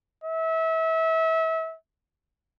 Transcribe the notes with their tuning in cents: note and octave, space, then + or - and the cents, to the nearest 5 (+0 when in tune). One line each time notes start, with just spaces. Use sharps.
E5 -30